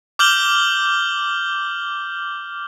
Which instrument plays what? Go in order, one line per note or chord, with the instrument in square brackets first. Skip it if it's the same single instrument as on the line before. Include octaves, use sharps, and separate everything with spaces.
[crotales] D6 F6 G6 F#7 G7